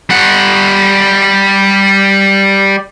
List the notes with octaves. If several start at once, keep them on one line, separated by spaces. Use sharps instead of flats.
G3 F#5